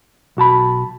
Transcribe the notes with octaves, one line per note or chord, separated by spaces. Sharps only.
B1 F#4 A5 B5